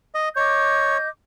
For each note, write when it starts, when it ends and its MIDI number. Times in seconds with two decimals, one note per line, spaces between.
0.15 0.29 75
0.36 0.98 73
0.36 1.09 75
0.36 1.09 86
0.36 1.09 91